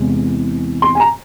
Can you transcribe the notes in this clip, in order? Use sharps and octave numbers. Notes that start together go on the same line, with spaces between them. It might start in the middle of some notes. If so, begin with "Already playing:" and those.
Already playing: E2 C3 E3 G#3
C6
G#5
A#5